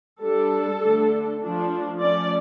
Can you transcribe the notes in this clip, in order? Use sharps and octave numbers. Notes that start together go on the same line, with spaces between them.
G3 D4 A4
D3 A3 D4
F3 A3 D4
F3 A3 C#4 D5